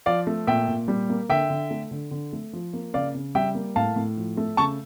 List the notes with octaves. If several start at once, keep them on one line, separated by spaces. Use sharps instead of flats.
F3 D5 F5
A3
A#2 E5 G5
A#2
G3
A#3
D3 E5 G5
D3
A3
D3
D3
A3
F3
A#3
C#3 D5 F5
C#3
G3 E5 G5
A#3
A2 F5 A5
A2
F3
A3
C#3 A5 C#6